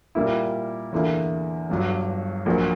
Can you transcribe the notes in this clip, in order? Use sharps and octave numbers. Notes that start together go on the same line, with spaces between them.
A#2 G3 A#3 E4
E2 D3 A#3 E4
G1 G2 F#3
A#1 A#2 F#3 A#3